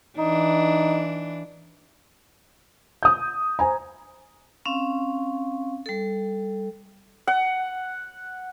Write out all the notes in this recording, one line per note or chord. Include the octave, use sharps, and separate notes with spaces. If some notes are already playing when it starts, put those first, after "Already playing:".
E3 D4 D#4
D#6 G6
C5 G#5 A#5
C4 C#4 F5
G3 A4
F#5